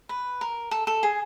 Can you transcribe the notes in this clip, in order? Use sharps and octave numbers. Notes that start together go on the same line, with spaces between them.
B4
A#4
A4
A4
G#4